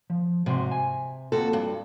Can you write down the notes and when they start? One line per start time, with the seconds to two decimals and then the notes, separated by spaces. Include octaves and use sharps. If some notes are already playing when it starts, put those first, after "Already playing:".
0.10 F3
0.46 G#2 C3 F#4 C6
0.71 G#5
1.32 A#3 C4 F4 F#4 A4
1.53 G2